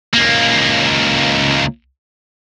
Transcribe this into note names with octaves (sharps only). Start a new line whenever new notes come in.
C#2 A#3